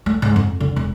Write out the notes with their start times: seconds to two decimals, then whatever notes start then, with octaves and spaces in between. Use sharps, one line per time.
0.06 A3
0.22 G#2
0.36 F2
0.60 D3
0.76 E1